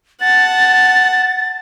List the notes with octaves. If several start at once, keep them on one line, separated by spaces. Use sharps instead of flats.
F#5 A5 A6